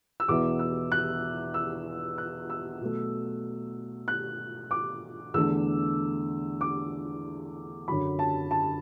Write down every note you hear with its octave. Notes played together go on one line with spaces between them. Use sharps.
E6
E2 B2 B3 E4 D6
E6
F#6
E6
F#6
E6
B2 F#3 A3
F#6
D6
E2 D3 A3 D4 E6
D6
F#2 D3 F#3 B5
A5
A5